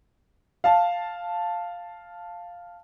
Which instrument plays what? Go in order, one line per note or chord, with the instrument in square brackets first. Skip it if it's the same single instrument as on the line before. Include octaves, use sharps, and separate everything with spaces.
[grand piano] F5 A5